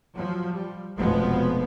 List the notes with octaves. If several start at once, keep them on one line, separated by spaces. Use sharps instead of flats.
F3 F#3
G3
F1 B2 F3 G#3 B3